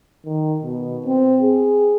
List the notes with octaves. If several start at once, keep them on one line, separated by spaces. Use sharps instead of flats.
D#3
B2
C4
G#4